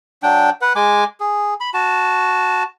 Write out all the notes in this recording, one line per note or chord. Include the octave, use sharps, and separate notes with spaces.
F#3 D4 G5
B4 F#5
G#3 G#5 D6
G#4
B5
F#4 A5